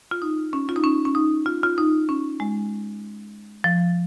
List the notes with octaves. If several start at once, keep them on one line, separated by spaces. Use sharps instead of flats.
F4
D#4
C#4
F4
D#4
C#4
C#4
D#4
F4
F4
D#4
C#4
G#3
F3